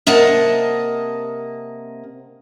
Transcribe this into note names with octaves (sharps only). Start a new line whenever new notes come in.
C3 A#3 D#5 F#5 A5